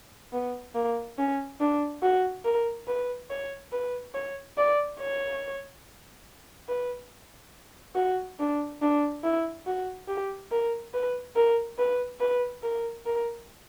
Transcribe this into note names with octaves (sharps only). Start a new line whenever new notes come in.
B3
A#3
C#4
D4
F#4
A#4
B4
C#5
B4
C#5
D5
C#5
B4
F#4
D4
D4
E4
F#4
G4
A#4
B4
A#4
B4
B4
A#4
A#4